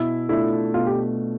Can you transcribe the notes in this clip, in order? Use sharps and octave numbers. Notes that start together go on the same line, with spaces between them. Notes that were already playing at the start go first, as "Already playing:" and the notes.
Already playing: B2 E4
A3 D4 E4 F4
B2 F4
G4